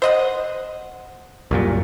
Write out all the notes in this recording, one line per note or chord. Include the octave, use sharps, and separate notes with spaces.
C5 D#5 F#5
C2 F#2 A#2